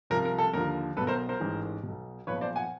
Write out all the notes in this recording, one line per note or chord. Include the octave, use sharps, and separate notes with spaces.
C2 C3 F3 A#4
A#4
A4
D#2 D3 F3 A#4
B1 B2 A4 B4
A#4 C5
A#4 C5
A1 G#2 E3
B1 B2
B1 A#2 F3 B4 C#5
C5 D5
F#5 G#5